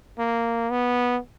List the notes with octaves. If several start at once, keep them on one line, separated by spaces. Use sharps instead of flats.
A#3
B3